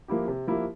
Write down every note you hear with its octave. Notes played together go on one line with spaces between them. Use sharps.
F3 A#3 E4 G4
C3
F3 A#3 E4 G4